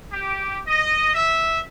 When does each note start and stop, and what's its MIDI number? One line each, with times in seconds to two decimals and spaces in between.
0.11 0.57 67
0.66 1.11 75
1.13 1.58 76